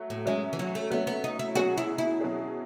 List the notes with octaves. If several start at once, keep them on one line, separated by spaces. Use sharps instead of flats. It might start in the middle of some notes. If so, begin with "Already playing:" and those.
Already playing: F#3 A3
A2
F#3 G#3 A3 C#4
E3
F#3
A3
F#3 A3 B3 C#4
B3
D#4
E4
B2 F#3 C#4 F#4 G#4
E4
E4
B2 F#3 C#4 G#4